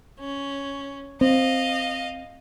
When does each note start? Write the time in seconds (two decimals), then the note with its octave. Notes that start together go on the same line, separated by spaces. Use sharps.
0.20 C#4
1.21 C4 D#5 F5